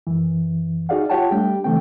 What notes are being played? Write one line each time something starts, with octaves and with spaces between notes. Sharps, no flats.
F#2 E3
D#4 F#4 G#4 D5 F5 F#5
F4 G4 C#5 F#5 G5 A5
G3 A3 D4 G4 G5
C#3 E3 A3 A#3 C4 G5